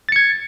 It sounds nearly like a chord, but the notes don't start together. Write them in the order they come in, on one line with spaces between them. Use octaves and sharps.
A6 C#7 G#6